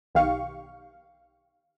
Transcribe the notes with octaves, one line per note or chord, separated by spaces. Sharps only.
B1 D#3 G4 F5 C#6